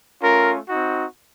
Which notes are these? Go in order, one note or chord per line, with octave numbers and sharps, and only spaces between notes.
A3 C#4 F4 A#4
C4 D#4 F#4